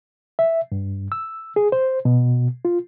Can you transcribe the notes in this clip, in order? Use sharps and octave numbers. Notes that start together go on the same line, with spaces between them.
E5
G2
E6
G#4
C5
B2
F4